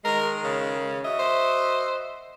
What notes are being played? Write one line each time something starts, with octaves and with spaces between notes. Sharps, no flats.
D#3 G#3 A#4
C#3
F#4 D#5 E5
C5